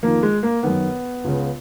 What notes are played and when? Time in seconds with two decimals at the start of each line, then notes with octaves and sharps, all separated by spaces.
0.03 F2 D#3 A#3
0.22 G#3
0.43 A#3
0.63 F#2 D#3 B3
1.24 C#2 C#3